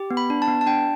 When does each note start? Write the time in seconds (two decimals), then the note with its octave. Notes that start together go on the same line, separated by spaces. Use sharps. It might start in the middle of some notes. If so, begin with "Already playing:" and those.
Already playing: G4
0.10 B3
0.17 B5
0.30 D4
0.42 A5
0.48 B3
0.61 A5
0.67 D4 G5